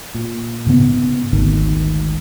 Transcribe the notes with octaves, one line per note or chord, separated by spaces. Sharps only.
A#2
G#2 C#3 B3
G#1 D2 D#3